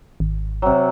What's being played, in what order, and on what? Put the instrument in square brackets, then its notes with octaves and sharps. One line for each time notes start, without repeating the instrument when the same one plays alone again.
[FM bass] G#1
[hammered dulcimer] C3 F#3